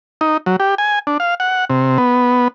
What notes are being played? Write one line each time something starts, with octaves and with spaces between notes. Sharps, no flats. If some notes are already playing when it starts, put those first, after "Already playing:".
D#4
F#3
G4
G#5
D4
F5
F#5
C3
B3